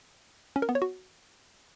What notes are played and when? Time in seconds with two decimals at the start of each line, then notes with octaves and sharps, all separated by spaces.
0.56 C#4
0.62 A#4
0.69 B3
0.75 C#5
0.82 F#4